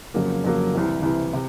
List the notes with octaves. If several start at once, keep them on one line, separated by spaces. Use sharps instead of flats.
F2 C#3 F#3 A#3
F2 C#3 F#3 A#3
C2 C3 E3
C2 C3 E3
C3